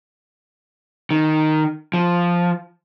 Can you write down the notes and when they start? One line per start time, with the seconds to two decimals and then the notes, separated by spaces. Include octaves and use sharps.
1.11 D#3
1.94 F3